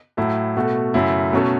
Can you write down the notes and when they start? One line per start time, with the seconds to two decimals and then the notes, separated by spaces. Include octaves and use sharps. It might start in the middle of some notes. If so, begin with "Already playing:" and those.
0.17 A2 F#3 A3 E4 A4
0.57 B2 A3 F#4 A4
0.94 F#2 C#3 F#3 A3 E4
1.33 B2 F#3 A3 C#4 A4